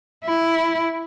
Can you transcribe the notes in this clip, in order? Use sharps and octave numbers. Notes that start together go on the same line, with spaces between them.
E4